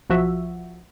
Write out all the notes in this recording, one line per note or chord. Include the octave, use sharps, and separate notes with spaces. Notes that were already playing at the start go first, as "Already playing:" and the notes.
B1 F3 F#4 E5